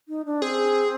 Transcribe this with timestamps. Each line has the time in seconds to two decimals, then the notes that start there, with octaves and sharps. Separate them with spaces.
0.08 D#4
0.25 D4
0.42 C4 G#4